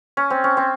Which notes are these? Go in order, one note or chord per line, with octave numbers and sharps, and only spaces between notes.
C#4
C4
C#4
C4